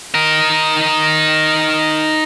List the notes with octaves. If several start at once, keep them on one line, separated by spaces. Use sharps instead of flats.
D#4 A#4